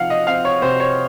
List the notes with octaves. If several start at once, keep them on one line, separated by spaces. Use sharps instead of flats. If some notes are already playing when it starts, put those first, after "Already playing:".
Already playing: C3 F3 D#4 F5 F#5
D#5
C4 F5
C#5
C3 C5
C#5